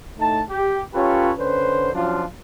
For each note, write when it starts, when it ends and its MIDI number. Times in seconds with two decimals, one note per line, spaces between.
0.19 0.43 45
0.19 0.43 57
0.19 0.43 63
0.19 0.43 81
0.50 0.80 67
0.95 1.32 61
0.95 1.32 65
0.95 1.32 67
0.95 1.32 69
0.95 1.32 71
0.95 1.32 73
1.38 1.92 50
1.38 1.92 61
1.38 1.92 71
1.38 1.92 72
1.94 2.24 53
1.94 2.24 54
1.94 2.24 61
1.94 2.24 62
1.94 2.24 65